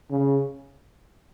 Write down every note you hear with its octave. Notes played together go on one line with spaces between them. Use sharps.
C#3